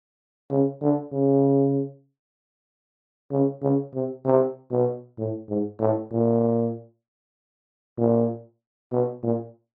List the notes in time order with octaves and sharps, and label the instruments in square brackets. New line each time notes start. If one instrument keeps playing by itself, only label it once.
[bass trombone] C#3
D3
C#3
C#3
C#3
C3
C3
B2
A2
G#2
A2
A#2
A#2
B2
A#2